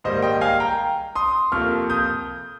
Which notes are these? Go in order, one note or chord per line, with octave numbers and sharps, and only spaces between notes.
G#2 D#3 G3 A#3 C5 D#5
D#5 G5
F5 G#5
G5 A#5
C6 D#6
F2 C3 F3 A#3 C#6 F6
D#6 G6